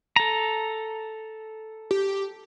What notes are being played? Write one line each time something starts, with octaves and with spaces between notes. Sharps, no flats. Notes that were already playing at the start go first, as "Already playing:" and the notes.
A4 A#5
G4